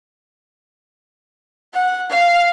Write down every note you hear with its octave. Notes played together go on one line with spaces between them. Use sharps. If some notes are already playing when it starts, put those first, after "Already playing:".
F#5
F5